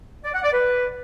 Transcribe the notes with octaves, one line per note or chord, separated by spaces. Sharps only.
D5
F#5
D5
B4